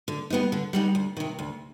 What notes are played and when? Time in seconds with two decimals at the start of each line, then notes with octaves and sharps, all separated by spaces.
0.08 D3
0.30 G3 B3 D#4
0.52 D3
0.73 G3 B3 D#4
0.95 D2
1.17 C3 D#3
1.39 D2